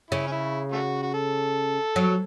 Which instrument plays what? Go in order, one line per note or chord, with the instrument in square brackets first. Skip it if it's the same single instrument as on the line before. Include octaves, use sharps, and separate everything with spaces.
[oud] C#3 [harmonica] E4
[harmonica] C#4
E4
A3 C#4 F#4
F#4
A4
[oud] F#3